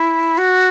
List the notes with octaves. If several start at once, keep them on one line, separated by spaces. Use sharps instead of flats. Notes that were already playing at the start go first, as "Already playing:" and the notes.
Already playing: E4
F#4